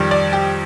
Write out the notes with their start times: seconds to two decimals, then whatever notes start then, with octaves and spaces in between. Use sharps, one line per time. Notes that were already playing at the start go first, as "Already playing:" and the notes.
Already playing: F2 D#3 G3
0.11 D5
0.33 G4